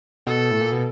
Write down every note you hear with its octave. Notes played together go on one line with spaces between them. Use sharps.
B2 A4
A2
A#2
B2